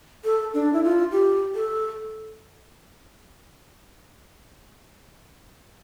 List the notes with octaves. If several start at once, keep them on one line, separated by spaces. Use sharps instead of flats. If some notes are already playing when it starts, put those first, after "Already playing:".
A4
D4
E4
F4
G4
A4